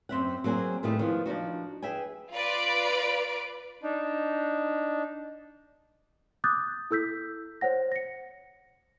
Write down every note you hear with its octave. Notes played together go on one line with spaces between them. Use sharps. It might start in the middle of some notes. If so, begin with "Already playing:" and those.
F#2 C4 E5 F#5
F#3 A#3 C4 G#4 G#5
A2 D#3 G3 A3 B3 G#4
D#3 F3 B3
F3 D4 D#4 F#4
G#4 B4 E5 G5 G#5
F4 B4 D5 D7
D4 D#4
D6 D#6 F#6 G6 A6
E4 A4 E6 G6 B6
C5 C#5 F#5 A#6
A#6 C#7